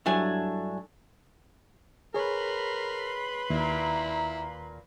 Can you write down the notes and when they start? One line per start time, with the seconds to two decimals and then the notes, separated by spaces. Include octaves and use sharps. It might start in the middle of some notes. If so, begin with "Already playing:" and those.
0.06 G2 F#3 A3 D4 E4 G#5
2.14 G#4 A#4 B4 C#5 B5 C6
3.50 D#2 A#2 A#3 E4